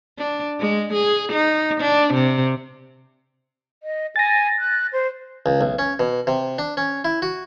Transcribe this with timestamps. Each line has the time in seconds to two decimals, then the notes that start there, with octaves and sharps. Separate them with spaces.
0.18 D4
0.60 G#3
0.94 G#4
1.33 D#4
1.80 D4
2.14 C3
3.83 D#5
4.16 G#5 A6 A#6
4.59 F#6
4.93 C5
5.46 C#2
5.61 B1
5.79 C#4
5.99 B2
6.27 C3
6.59 D4
6.77 C#4
7.05 E4
7.22 F#4